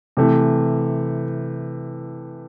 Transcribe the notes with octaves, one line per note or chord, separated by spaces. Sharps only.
C3 E3 A3